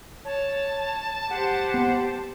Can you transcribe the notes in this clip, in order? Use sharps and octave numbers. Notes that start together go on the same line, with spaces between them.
C#5 A5
G4 C5 F#5
B3